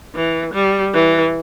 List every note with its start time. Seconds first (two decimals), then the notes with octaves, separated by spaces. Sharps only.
0.15 E3
0.54 G3
0.94 E3